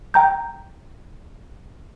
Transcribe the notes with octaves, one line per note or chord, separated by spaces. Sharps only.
G5 A#5 G6